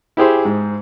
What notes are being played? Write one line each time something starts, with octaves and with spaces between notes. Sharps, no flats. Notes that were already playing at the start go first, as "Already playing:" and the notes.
E4 G4 G#4 C5
G#2